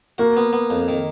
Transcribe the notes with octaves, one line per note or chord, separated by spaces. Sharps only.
A#3 F#4
B3
B3
F2
D#3